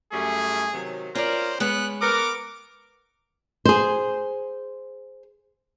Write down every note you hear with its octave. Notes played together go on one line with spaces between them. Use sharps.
F#2 G3 A3 G#4
C3 D#3 F#3
C#4 F4 A#4 C5 D5
G#3 B3 C#4 F#6
B3 A#4 D6
G#4 C5